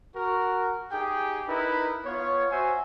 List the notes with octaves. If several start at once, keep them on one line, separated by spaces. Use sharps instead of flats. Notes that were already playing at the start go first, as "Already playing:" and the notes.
F#4 A#4
D#4 G4 G#4 G5
D#4 E4 A#4 B4
B3 F4 C#5
F#4 C5 E5 G#5